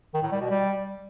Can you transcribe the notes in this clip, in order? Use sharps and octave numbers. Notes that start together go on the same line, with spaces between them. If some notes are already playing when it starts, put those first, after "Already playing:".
D#3
A2
G3
B2
G3